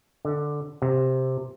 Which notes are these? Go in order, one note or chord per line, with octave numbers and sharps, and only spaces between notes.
D3
C3